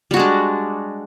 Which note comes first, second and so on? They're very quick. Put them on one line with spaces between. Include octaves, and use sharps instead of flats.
G3 F#4 G#3 D4